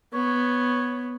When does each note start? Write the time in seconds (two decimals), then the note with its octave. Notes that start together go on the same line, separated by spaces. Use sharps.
0.14 B3 C#5